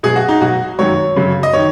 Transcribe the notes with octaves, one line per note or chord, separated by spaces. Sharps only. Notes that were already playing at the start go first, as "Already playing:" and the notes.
B2 F#3 G#4
F#4
D#4
B2 F#3 F#4
F#2 D#3 F#3 C#5
F#2 C#3 F#3
D#5
D#3 C#5